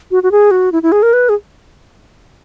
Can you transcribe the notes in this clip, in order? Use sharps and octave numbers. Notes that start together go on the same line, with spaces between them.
F#4
F#4
G#4
F#4
E4
E4
G#4
A#4
B4
G#4